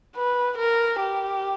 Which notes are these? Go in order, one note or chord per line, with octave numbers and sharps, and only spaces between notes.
B4
A#4
G4